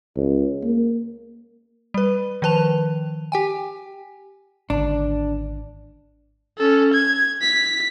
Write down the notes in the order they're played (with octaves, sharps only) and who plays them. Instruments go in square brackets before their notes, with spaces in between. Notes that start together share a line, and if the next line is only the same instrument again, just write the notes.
[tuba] C#2
A#3
[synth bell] G3 B4
D#3 F3 B4 A5 F7
G4 G5 G#5
[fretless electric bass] G#1 D3 [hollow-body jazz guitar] D4
[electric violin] C#4 A4
G#6
B6